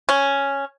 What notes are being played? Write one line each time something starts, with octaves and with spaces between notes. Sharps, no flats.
C#4